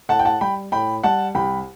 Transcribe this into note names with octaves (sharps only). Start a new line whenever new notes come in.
A2 F#5 A5
G5
F#5 A5
G3 G5 B5
A2 G5 B5
G3 F#5 A5
C2 G5 B5